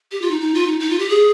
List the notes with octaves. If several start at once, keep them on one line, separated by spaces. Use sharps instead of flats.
G4
F4
D#4
D#4
F4
D#4
D#4
F4
G4
G#4